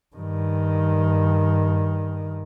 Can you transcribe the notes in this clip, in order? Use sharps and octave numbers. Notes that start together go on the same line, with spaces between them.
G2 D#3